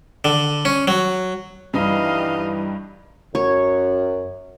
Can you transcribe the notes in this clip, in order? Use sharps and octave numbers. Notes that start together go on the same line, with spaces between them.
D3
C#4
F#3
G2 E3 G3 D#4 D#5 F5
F#2 C#5